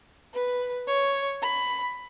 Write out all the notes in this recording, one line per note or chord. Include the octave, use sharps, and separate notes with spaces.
B4
C#5
B5